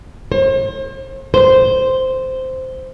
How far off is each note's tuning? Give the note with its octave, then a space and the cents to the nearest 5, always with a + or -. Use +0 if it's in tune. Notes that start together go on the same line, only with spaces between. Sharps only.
C5 +45
C5 -10